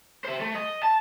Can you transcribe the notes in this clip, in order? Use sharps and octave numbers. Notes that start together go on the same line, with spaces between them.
C5 E5
A3
D#5
A5